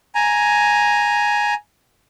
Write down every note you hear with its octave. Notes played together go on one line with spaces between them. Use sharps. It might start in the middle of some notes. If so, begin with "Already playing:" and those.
G#5 A#5